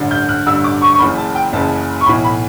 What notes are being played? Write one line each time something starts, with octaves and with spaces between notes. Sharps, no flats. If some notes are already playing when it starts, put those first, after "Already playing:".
Already playing: A1 G2 D3
G6
F#6
A1 G2 D3 E6
D6
C#6
C#6
F#1 F#2 C#3 E3 B5
A5
G5
F#1 F#2 C#3 E3 A5
C#6
B1 A2 E3 B5
B5